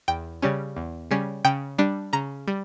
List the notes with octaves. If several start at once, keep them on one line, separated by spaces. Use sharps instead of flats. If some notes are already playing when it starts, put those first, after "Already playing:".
E2 G5
C#3 G3 C#4
E2
C#3 G3 C#4
C#3 G5
G3 D4
C#3 A#5
G3